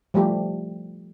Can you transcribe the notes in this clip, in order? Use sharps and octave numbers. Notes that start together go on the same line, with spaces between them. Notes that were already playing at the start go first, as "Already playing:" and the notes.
F3 G3 A3 G4